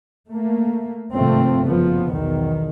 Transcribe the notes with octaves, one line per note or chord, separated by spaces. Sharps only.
A3 A#3
G#1 G2 C3 F3 A3 C4
F#1 F3 B3
B1 E2 B2 D#3